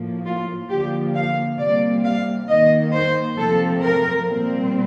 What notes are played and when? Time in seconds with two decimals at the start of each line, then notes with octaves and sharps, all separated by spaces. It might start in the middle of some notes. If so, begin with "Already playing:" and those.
Already playing: A2 F3 A#3
0.25 F4
0.69 D3 F3 A#3 G4
1.14 F5
1.59 C3 G3 A#3 D5
2.04 F5
2.48 D#3 A#3 D#5
2.93 C5
3.37 C3 F3 A3 C4 A4
3.82 A#4
4.27 A#2 G3 C4